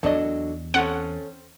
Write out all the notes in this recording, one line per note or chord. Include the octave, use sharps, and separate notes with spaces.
E2 F#3 D4 A4 D#5
C4 C#4 A4 C#5 F#5